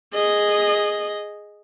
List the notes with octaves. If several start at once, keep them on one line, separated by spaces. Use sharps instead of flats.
G#4 D#5